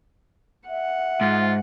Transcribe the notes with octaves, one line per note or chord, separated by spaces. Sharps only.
E5 F#5
G#2 F4